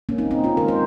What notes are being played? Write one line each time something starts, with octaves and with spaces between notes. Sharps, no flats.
A#3 C#4
C4 D#4
C4 D#4
C#4 F4
D#3 G#3 A#4
C5